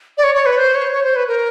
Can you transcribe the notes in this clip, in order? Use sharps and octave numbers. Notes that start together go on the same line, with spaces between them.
D5
C#5
C#5
B4
C5
C#5
C#5
C5
B4
A#4